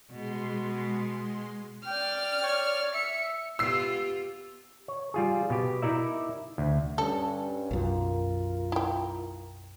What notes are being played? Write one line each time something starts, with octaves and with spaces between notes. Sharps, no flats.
B2 G#3 C6
D5 G5 F6
C#5
E5 C#7
B3 F4 G4 E6 C7
C#5
G3 F4 G#4
B2 G4
D#4 E4 A#4 D5 E5
D2
G2 C#4 A4
B1 F#2 F4 A#4
E4 G5